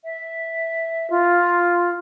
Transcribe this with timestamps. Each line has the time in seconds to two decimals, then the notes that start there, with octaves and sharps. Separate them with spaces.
0.04 E5
1.10 F4